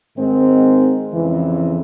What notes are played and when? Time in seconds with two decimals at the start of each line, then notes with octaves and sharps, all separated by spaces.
0.15 G#2 D#3 G#3 C4 D#4
1.11 F2 C#3 E3